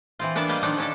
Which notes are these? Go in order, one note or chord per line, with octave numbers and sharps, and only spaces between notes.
E3 C4 F4
B3 D4 A#4 B4 A5
G3 A#3 B4 D#5 A#5
D#3 F3 F#3 B3 D4 D#4
C#4 D4 A4